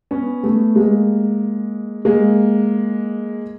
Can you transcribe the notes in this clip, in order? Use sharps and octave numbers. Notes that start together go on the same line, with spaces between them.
B3 C#4
A3 B3
G#3 A#3
G#3 A#3